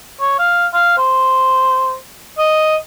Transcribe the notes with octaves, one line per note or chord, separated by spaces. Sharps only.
C#5
F5
F5
C5
D#5